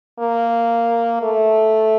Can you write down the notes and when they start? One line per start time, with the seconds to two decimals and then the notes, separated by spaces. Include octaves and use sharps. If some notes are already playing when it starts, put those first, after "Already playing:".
0.19 A#3
1.23 A3